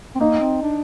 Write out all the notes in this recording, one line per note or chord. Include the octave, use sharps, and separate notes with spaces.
C4
A#3 D#4
C4
D4